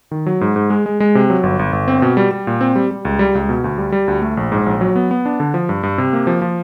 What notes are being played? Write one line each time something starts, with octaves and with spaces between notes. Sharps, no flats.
D#3
F#3
G#2
G#2
G#3
G#3
G#3
C3
F#3
G1
G1
G1
C4
B2
G3
G3
A#2
C4
G3
G3
C#2
G3
C#2
B2
D2
G3
G3
D2
A3
A#1
G#2
A#1
F#3
B3
B3
D4
D3
F3
G2
G2
C3
A#3
F3
F3